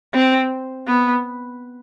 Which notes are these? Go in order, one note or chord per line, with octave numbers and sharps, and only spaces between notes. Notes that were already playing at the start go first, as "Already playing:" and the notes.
C4
B3